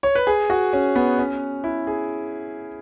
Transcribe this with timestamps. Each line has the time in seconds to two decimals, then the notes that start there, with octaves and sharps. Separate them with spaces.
0.03 C#5
0.15 B4
0.27 G#4
0.50 F#4
0.73 C#4
0.96 B3
1.19 C#4
1.64 E4
1.87 G#4